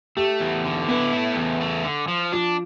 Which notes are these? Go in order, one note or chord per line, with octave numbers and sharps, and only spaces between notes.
A3 G4
E2
D3
B3 E4
A3
E2
A3
D3
F3
F3 D4